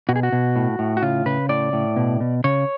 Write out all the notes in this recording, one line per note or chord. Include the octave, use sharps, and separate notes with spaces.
B2 F#4
G#4
F#4
B2
A2
A2
F#4
C#3 F4
C#3 B4
A2 D5
A2
B2
B2
C#3 C#5